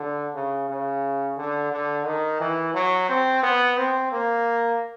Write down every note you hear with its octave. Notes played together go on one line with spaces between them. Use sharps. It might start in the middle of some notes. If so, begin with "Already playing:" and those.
Already playing: D3
C#3
C#3
D3
D3
D#3
E3
F#3
C4
B3
C4
A#3